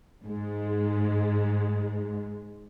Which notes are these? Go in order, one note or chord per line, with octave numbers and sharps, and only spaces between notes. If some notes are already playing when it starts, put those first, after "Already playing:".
G#2 G#3